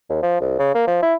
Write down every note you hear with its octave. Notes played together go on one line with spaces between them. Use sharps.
D#2
F3
C2
C#3
A#3
F3
E4